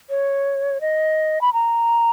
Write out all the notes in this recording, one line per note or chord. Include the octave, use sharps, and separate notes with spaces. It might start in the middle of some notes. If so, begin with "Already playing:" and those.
C#5
D#5
B5
A#5